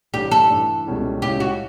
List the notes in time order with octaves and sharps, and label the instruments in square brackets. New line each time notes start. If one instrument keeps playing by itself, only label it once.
[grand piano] A1 A2 G3 D4 [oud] G4
[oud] A4
[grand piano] G2 E3 A3 D4
C#2 B2 G3 C#4 E4
[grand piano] C#2 C#3 G3 C#4 E4 [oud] G4
[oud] F#4